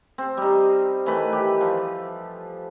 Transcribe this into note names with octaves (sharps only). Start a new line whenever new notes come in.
C4 A5
G3 D#4
D#3 E3 A3 B4
G4
F3